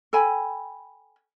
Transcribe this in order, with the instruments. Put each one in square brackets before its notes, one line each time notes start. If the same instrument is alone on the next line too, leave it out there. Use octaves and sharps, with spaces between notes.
[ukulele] A4 G5 G#5 B5